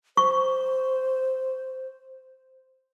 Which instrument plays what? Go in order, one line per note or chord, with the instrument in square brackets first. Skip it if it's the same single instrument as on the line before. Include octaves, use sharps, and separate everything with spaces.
[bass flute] C5 [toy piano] C#6